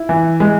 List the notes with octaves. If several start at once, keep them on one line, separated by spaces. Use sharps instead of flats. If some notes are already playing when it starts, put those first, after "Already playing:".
Already playing: E4
E3
G#3